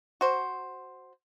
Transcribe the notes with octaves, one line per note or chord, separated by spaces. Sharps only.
F#4 C5